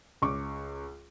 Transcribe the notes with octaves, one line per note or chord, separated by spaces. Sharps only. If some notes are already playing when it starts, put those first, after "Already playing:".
C#2 C#6 D6